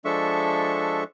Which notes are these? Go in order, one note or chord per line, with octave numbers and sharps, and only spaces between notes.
F3 G#3 D4 A4 E5 C#6